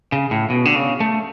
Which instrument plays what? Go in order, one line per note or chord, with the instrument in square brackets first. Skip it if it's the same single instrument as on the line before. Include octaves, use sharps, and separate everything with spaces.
[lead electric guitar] C#3
A2
B2
D3
C#3
A3